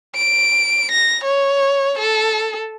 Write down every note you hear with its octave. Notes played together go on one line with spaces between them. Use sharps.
D7
A#6
C#5
A4